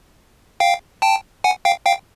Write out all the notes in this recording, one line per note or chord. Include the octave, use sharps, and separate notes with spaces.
F5 G5
G5 A5
F#5 G#5
F5 G5
F5 G5